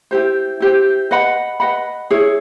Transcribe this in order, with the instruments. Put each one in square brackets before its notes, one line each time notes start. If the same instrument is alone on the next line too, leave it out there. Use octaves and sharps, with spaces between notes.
[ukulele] E4 G4 C5
E4 G4 C5
B4 D#5 F#5 B5
B4 D#5 F#5 B5
E4 G#4 C#5